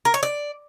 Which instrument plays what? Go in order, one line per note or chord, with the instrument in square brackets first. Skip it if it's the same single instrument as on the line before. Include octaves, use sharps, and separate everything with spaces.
[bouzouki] A#4
C#5
D5